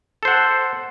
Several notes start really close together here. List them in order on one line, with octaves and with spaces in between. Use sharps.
A4 C5 F#5